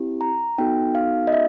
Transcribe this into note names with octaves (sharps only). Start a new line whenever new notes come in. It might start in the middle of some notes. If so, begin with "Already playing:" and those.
Already playing: C4 E4 G4
A#5
B3 D#4 F#4 A4 G5
F5
D#5
E5